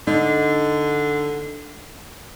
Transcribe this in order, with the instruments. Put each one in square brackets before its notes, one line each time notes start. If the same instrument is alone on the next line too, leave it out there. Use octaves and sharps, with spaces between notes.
[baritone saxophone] D3 [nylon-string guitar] D#4